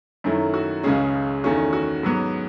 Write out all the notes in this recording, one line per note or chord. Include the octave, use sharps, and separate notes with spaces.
F#2 D#3 F#3 A3 E4
F#4
C#2 C#3 G#3 C#4 G#4
E2 D#3 A3 C#4 F#4
F#4
G#2 F#3 B3